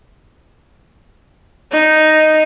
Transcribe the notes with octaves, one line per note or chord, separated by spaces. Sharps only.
D#4